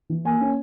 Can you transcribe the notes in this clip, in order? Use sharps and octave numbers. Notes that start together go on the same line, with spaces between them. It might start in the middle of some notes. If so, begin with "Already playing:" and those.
E3
A#3 G#5
C#4